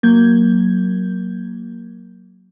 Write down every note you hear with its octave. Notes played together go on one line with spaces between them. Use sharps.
F#3 A#3 G6 G#6